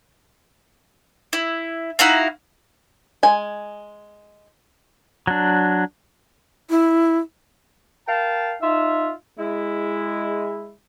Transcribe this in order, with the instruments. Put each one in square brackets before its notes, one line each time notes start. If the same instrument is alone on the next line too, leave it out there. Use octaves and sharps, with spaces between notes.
[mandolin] E4
D#4 E4 F#4 F5
[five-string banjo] G#3 G#5
[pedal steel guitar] F#3 D4
[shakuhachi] E4
[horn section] A#4 F5 G5 A5
D#4 F4 E5
G#3 E4